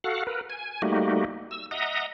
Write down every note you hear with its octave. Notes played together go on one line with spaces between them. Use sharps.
F#4 A4 F5 F#5
A#4 B4
G#5
G3 A3 A#3 D#4 F#4 G4
E6
D#5 E5 F#5 A#5 D#6